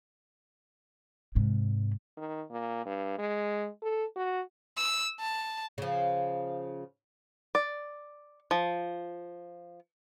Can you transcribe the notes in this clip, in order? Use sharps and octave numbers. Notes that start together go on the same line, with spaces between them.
G#2 C3
D#3
A#2
G2
G#3
A4
F#4
E6
A5
C#3 F3
D5
F3